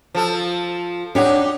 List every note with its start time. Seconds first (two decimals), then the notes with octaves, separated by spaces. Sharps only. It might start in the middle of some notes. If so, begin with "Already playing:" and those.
0.15 F3 A4
1.15 D4 D#4 G4 C#5 F#5